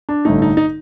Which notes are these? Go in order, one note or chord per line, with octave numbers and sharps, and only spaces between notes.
D4
A1 G2 D3 A3 D#4
D#4
D#4